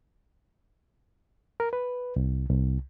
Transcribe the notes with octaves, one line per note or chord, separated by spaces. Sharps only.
A#4
B4
C2
C2